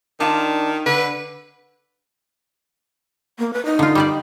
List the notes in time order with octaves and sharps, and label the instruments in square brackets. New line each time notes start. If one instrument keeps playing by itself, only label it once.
[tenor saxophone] D#3 [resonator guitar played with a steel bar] D4 F4
[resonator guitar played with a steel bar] D3 [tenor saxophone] B4
[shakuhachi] A#3
B4
D#4
[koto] D3 F4
G3 G4 D5